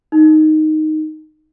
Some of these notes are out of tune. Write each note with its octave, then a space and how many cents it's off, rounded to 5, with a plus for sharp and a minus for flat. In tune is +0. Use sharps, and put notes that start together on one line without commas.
D#4 +0